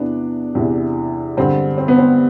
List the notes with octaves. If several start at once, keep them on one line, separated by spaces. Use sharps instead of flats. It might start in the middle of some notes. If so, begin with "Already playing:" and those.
Already playing: E2 C3 E3 B3 D4
E2 C3 E3
G2 D3 C4
C4
B3
C4